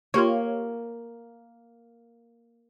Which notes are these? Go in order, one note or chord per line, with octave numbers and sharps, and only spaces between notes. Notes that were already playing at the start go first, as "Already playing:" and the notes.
A#3 F4 G4 C#5